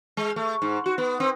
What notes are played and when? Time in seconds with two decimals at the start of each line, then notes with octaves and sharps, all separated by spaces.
0.17 G#3
0.36 A3
0.62 G#2
0.86 F#4
0.98 B3
1.20 C4